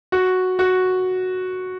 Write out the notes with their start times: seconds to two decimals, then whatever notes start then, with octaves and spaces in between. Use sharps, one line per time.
0.12 F#4
0.59 F#4